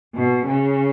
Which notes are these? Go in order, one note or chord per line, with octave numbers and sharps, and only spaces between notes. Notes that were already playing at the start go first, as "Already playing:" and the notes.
B2
C#3